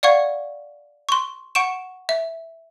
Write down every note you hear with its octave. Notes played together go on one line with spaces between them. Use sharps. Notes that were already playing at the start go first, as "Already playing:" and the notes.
D5 F5 F#5 C#6 G#6
C6 C#6
F#5 C#6 D7 E7
E5